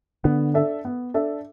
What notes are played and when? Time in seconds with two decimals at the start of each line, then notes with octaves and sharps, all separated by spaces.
0.24 D3 B3
0.54 D4 A4 E5
0.85 B3
1.14 D4 A4 E5